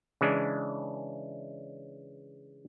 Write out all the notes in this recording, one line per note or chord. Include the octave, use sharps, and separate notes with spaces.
C#3 E3 G#3 D4